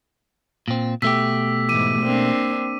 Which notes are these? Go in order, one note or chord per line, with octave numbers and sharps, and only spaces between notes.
A#2 C4
B2 A3 G4 E6 B6
G#2 E3 D6 D#7
A#3 C4 D4